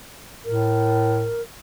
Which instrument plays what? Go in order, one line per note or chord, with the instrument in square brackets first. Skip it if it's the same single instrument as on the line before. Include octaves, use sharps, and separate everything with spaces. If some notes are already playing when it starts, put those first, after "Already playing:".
[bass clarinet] A2 [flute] A#4